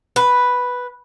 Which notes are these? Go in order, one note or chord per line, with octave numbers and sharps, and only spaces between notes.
B4